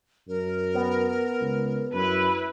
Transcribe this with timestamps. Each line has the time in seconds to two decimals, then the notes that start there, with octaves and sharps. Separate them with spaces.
0.28 F#2 A#4
0.75 B3
1.41 C#2
1.94 F#2 E4 B4